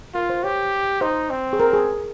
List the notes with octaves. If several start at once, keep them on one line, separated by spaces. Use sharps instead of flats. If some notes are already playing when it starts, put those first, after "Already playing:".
F4 A#4
C5
G4 C#5
D#4 C5
C4
G#4
A#4
G#4